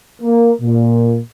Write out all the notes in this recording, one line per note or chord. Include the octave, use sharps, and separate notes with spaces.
A#3
A#2